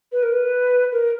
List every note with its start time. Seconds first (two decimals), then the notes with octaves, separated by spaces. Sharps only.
0.12 B4
0.23 A#4
0.33 B4
0.92 A#4